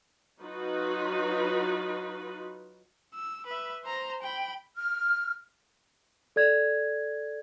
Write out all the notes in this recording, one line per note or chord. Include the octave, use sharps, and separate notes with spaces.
F#3 D#4 F4 F#4 B4
E6
B4 E5
C5 A#5
G5 B5
F6
A4 D5 G#6